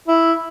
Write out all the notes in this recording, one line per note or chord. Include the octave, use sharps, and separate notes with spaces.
E4